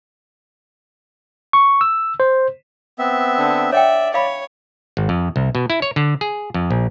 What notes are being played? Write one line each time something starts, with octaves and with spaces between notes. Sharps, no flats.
C#6
E6
C5
B3 C4 E5
D3
C#5 D5 E5 F#5 G5
C#5 F5 B5
G#1
F2
C2
B2
E4
C#5
D3
G#4
F2
A#1